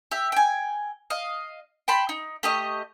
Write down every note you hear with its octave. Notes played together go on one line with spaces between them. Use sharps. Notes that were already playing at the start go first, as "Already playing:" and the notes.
G4 E5
G5 G#5
D#5 F5
G5 A5 B5 C6
D#4
A3 G4 D#5